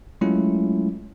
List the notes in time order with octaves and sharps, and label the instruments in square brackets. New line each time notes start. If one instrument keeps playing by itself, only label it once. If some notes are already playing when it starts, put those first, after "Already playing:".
[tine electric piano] F#3 G#3 A3 C#4 E4 F4